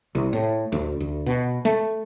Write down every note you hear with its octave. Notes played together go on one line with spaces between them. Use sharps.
C2
A2
D2
D2
B2
A3